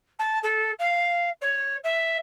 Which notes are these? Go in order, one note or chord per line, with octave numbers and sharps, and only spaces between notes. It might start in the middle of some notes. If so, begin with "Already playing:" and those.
A5
A4
F5
C#5
E5